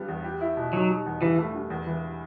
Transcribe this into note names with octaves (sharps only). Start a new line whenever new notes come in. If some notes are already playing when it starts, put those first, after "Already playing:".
Already playing: G2 G3 B3
E2
G4
E4
B2
F#3 D#4
G3
E2
G2 E3
A3
G2
E2
E3